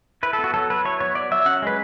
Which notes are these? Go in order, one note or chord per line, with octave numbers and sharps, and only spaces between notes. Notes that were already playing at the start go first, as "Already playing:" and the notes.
E4 B4
A4
B3
F#4
F#3 A4
F#3 B4
E4 C#5
B3 C#5
F#3 D5
F#3 E5
C#4 F#5
G#3 B4